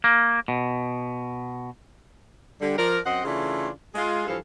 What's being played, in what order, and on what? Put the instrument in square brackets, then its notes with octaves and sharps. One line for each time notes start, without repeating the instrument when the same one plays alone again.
[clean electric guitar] A#3
B2
[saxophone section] D3 G3
F3 A#4 D5
F#2 C4 C5 D#5 F#5
C#3 E3 A3 D4 F4 A4
G#3 F4 G#4
G2 E3 F3 A4 F5